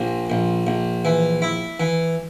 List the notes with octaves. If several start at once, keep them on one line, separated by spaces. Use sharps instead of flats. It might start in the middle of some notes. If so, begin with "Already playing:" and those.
Already playing: A#1 A#2
A#1
A#1
E3
E4
E3